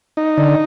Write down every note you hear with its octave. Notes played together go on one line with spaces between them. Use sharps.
D#4
D3